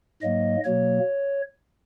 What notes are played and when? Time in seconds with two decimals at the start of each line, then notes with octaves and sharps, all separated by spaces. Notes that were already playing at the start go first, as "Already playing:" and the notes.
0.22 G#2 F#3 A#3 D#5
0.64 B2 F#3 A#3 C#5